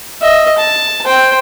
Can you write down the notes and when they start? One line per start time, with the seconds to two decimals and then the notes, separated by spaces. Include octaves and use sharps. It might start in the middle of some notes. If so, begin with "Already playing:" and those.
0.21 D#5 E5
0.58 A5
1.05 C5 G5